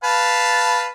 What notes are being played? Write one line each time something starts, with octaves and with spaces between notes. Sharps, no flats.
B4 F5 A5